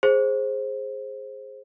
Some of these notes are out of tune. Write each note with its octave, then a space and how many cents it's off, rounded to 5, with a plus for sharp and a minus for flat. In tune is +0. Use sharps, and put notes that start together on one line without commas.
G#4 +0 C5 +15